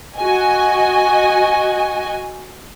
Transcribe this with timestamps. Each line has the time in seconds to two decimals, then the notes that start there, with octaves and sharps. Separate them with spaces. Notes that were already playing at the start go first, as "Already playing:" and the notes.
0.18 F#4 D#5 G#5